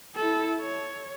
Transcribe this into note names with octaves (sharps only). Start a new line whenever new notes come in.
E4 A4
C#5